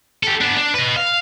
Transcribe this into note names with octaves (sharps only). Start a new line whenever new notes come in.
G4 A4
B3 D4
D4
B4 D#5
F5